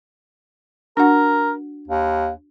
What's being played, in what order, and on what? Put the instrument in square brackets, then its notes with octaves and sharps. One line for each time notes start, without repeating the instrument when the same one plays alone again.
[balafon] D4 F#4 F#5 [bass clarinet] A#4
[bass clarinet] D#2